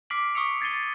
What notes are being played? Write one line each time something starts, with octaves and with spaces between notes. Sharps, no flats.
D6 F6 B6 C7 D7 F#7
C#6 D#6 E6 C7 C#7 F7
G#6 A6 C7 D#7 G7